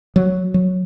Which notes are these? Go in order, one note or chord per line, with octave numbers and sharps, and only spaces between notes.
F#3
F#3